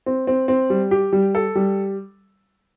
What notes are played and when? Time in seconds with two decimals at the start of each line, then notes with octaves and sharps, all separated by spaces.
0.06 C4
0.27 C4
0.48 C4
0.70 G3
0.91 G4
1.13 G3
1.35 A4
1.55 G3